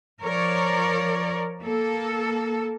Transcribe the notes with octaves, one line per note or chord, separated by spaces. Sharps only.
F3 A#4 C#5 D5
A#3 A4